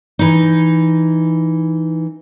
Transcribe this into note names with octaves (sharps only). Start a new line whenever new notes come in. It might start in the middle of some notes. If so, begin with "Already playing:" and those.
E3 D#4